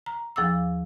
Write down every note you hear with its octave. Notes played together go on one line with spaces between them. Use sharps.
A#5
D#2 F3 G#4 F5 D6 E6